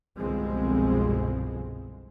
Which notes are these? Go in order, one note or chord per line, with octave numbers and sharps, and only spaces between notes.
G1 C2 B2 F3 G#3 C4